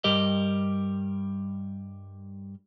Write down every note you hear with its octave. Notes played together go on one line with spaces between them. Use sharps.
G2 G3 G4 A#4 D#5